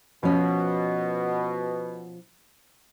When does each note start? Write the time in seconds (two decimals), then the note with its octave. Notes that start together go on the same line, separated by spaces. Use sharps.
0.23 B2 F3 C#4